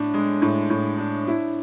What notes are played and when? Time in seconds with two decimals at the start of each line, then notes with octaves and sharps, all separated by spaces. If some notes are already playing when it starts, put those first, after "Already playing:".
Already playing: A2 D4
0.14 G#3
0.42 A2
0.70 A2
0.98 D4
1.27 E4